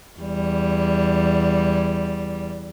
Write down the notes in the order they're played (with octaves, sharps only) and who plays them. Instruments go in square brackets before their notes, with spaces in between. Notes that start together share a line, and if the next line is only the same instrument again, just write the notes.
[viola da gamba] E2 G3